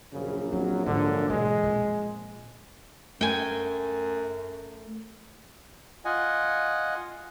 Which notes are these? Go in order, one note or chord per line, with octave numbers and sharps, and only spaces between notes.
A#1 F#2 C#3
F#3 C4
G#2 D3 F3
B2 E3 G#3
F2 A#2
F#2 A3 G5 G#5
F4 D#5 F#5 G#5